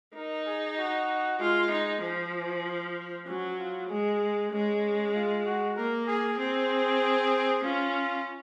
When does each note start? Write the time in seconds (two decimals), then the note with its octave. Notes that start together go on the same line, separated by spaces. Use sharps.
0.15 D#4 A#4
0.46 G#4
0.78 F#4
1.39 G#3 F4
1.71 D#4
2.02 F3
3.27 F#3 C#4
3.58 F4
3.89 G#3 G#4
4.51 G#3 C#4
5.14 F4
5.46 F#4
5.76 A#3 A#4
6.07 G#4
6.38 C4 G#4
7.63 C#4 F4